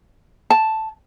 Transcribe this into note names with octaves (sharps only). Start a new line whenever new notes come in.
A5